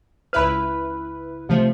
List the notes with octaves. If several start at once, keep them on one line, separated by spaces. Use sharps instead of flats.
C#2 E4 B4 B5 F6
C3 F3 A3